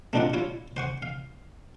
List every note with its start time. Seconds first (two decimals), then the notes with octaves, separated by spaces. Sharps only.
0.13 A3 C4 D4 D#4 F4 F#5
0.33 E4 F4 C#5
0.77 C5 F#5 C#6
1.02 F5